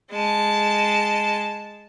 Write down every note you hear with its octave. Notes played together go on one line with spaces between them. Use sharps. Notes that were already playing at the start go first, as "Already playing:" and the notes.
G#3 A5